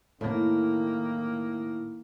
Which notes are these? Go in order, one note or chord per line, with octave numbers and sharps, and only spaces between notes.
A2 D#3 A#3